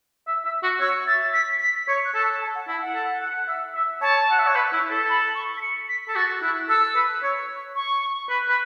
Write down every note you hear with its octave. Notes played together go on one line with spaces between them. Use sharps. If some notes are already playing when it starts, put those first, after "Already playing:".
E5
E5
F#4
C#5 E6
E5 A6
B6
B6
C#5
F#6
A4
E6
A5
F#5
E4 A5
F#5
A4
F#5
E5
E5
C#5 A5
F#5
E5
C#5
B4
E4
A4
B5
C#6
B6
C#7
B6
A4
F#4 A6
E4 F#6
A4 E6
B4
C#5
C#6
B4
B4